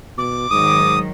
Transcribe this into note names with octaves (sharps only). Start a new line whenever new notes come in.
B2 D6
G#2 D#3 F#3 D#6